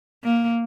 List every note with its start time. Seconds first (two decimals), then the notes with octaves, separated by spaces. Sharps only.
0.24 A#3